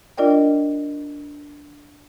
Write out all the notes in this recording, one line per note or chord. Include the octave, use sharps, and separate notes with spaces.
D4 F4 A#4 D5 D#5 G5